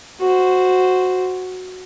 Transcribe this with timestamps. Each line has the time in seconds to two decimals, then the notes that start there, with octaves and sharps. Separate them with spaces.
0.21 F#4 C5